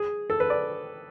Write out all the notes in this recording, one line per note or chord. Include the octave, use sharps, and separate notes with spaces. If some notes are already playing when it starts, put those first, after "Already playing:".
Already playing: G#4
A4
B4
D5